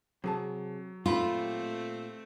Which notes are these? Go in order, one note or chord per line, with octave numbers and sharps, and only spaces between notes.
C3 F#3 G#4 A5
A#2 A3 C4 F4 G4 B5